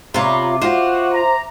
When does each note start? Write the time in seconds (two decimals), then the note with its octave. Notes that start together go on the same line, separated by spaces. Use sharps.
0.14 C3 F4 C#5 E5 A#5 B5 D6
0.62 F4 F#4 C5 F#5
1.11 A#5